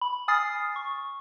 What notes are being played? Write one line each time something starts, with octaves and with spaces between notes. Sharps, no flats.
B5
G#5 D#6 F6 A6 C7
C#6